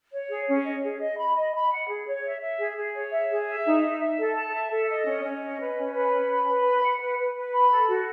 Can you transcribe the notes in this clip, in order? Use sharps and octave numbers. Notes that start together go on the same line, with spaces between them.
C#5
G#4
C#4
D#5
G#4
D#5
B5
D#5
B5
F#5
G#4
C#5
E5
E5
G#4
G#4
C#5
E5
G#4
E5
D#4
E5
E5
A4
A5
E5
A4
D#5
C#4
C#4
D#5
B4
C#4
B4
C#4
B5
B4
B5
F#5
B4
B4
B4
B5
A4
F#4